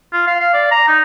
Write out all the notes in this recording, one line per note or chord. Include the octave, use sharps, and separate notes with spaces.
F4
F5
F5
D5
A#5
D#4